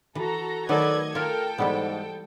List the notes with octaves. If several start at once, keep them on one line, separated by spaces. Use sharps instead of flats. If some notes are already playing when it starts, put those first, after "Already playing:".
E3 F#4 A4 A#5
D#3 F#3 A3 A4 B4 D5 D#5 G#6
F4 A4 A#4 G5
G#2 E3 G3 B3